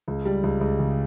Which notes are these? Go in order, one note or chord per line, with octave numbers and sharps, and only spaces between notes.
C#2
G3
C#2
C#2
C#3